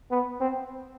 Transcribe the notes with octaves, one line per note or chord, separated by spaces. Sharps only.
B3
C4